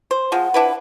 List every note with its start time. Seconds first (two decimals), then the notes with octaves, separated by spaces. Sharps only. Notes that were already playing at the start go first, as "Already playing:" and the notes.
0.11 C5
0.32 F3 G#3 F#5
0.54 D4 E4 B4